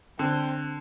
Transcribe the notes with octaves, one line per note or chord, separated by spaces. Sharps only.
D3 C4